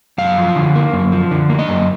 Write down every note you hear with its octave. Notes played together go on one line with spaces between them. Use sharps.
F#2 F5
F3
D3
A#3
F#2
F3
D3
A#3
D#5
F#2